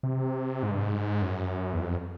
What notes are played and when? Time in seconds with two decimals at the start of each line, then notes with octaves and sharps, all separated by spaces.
0.03 C3
0.63 G#2
0.71 G2
0.81 G#2
1.22 F#2
1.73 E2
1.81 F2